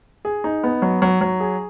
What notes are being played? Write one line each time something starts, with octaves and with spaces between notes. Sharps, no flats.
G#4
D#4
B3
F#3
F#3
F#3
G#4